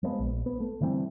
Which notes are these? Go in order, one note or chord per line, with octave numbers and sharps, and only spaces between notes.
F3 G#3 A#3 B3
A#1
B3
A3
D3 E3 G3 C4